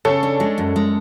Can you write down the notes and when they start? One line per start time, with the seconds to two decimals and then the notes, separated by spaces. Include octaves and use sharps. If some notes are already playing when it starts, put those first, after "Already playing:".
0.05 C#3 A4 C#5
0.23 D4
0.40 G#3
0.58 F#2
0.76 G#3